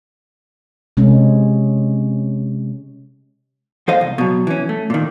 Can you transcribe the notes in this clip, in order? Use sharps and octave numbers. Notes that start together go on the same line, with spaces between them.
C3 G#3 C#4
E2 A4 C5 D#5 F5
C2
B2 F#3
E3 C#4
A3
A#2 D#3